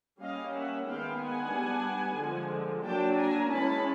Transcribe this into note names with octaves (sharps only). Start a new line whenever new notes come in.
G3 A#3 C#4 D#5 F5
E5 F#5
D#3 G#3 B3 F5 G5
F#5 G#5
G3 B3 D4
D3 F3 G#3
F#3 A#3 D4 G5 A5
G#5 A#5
E3 G#3 C#4 A5 B5